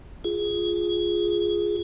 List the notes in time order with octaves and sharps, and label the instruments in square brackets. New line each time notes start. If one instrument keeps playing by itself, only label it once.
[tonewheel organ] F4 G#4